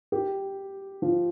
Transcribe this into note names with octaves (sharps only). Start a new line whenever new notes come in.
G4
F3